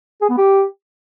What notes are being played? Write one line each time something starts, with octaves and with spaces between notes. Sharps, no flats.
G#4
B3
G4